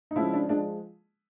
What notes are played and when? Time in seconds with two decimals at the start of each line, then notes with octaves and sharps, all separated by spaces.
0.11 D#4
0.16 C#3 F3 G#3 E4
0.33 D4
0.49 F3 G#3 D4